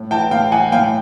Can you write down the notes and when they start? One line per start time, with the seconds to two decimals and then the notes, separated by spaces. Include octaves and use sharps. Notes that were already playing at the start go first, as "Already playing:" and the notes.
Already playing: A2
0.11 E3 G5 A5
0.31 A2 F5 G5
0.51 E3 F#5 G#5
0.72 A2 F5 G5